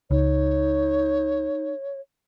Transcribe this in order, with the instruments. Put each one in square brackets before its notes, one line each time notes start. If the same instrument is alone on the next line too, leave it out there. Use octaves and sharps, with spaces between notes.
[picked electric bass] C#2 [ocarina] D#4 [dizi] C#5